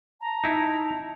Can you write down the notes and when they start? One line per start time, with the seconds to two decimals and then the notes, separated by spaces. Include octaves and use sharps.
0.21 A5 A#5
0.44 D#4 E4